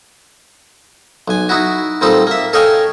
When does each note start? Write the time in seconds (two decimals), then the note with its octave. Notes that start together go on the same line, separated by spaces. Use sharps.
1.28 B1 G#5
1.49 D#4 E4 F#4
2.01 A#2 G3 C4 D#4 A4
2.27 A#3 E5
2.53 A4 C#5 D#5 F5 G5 G#5